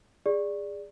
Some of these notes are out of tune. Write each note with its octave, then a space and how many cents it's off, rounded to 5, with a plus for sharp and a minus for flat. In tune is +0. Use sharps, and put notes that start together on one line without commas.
G#4 -20 D5 +0